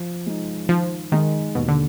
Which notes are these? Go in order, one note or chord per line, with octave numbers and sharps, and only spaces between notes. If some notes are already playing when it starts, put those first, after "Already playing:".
Already playing: F3
G#3 D#4
D#3 F3
D#3 G#3 D#4
D#2 B2
D3